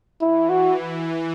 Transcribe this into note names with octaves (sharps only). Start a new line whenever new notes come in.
E3 E4
F#4